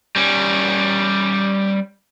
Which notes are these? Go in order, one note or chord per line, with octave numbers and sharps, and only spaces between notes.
G3 C#4